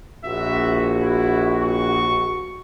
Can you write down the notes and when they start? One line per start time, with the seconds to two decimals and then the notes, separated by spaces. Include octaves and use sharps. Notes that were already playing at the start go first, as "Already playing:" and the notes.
0.24 A#1 F#4 E5
1.02 E4
1.61 C#6